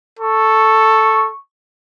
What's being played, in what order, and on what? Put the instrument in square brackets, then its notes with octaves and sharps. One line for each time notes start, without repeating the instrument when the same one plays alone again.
[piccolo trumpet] A4 [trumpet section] C#6